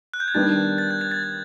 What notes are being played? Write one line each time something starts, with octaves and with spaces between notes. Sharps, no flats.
F#6
G6
G#6
D#3 G3 B3 D4 G4 A6
A6
G6
G#6
A6
A6